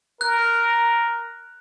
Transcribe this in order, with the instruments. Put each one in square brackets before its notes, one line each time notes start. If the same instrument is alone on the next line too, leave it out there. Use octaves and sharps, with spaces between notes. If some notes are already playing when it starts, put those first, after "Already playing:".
[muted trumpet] A#4 [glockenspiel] F#6